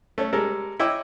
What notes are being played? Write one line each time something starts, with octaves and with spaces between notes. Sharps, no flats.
A3 C#4
G3 G#3 A4 A#4
E4 C#5 D#5 G5 D6 E6